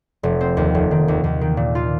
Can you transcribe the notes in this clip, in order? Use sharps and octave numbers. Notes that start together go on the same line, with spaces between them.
F1
C4
D#2
F1
D#3
D#2
D#2
D#3
A#2
F4